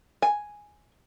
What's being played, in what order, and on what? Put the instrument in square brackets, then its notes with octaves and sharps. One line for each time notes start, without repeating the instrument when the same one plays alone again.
[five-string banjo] G#5